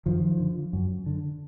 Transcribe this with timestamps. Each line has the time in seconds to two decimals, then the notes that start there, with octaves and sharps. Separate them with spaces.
0.06 F#2 D#3 F3
0.40 D3
0.73 F#2
1.06 D3